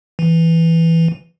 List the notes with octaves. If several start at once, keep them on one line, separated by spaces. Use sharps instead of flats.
E3